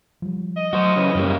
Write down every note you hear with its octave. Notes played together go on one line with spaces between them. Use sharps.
F3 G3
D#5
F#3 F#4 C5
C#3 E3
F#2 C#3 G3 A#3